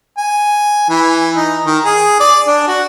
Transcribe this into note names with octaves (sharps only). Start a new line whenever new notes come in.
G#5
E3
D#4
D#3
G#4
D5
D4
F#4